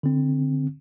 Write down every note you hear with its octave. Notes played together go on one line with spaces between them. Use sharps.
D3 C4